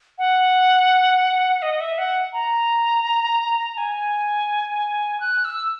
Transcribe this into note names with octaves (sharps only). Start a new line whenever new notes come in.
F#5
D#5
E5
F#5
A#5
G#5
F#6
E6